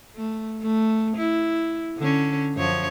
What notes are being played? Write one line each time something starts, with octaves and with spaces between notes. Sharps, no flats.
A3
A3
E4
D3 C#4
F#2 F3 C#5